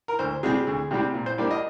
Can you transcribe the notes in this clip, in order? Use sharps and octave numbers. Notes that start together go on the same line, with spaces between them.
A#4
D2 C5
C3 G3 C4 G#4
D2
C3 G3 C4
A#2
C5
G3 A#3 D4 D5
D#5